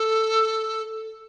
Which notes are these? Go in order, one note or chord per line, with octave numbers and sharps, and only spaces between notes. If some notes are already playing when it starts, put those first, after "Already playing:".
Already playing: A4